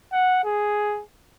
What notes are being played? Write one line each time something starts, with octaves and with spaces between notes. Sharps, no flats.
F#5
G#4